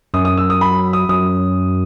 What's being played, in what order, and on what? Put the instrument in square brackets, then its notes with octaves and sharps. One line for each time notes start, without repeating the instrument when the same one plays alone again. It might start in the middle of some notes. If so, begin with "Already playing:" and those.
[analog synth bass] F#2 [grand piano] D#6
[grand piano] D#6
E6
D#6
B5
D#6
[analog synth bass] F#2 [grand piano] D#6